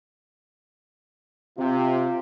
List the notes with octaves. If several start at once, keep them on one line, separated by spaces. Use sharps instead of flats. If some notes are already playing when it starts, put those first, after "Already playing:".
C3 F4